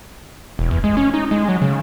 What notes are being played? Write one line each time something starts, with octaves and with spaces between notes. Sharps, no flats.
E1
E2
G#3
C#4
D#4
G#3
F#3
C#3